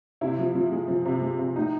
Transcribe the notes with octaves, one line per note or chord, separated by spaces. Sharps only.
C3 E4
F3
F3
G#3
F3
C3
G#3
C3
A2 D#4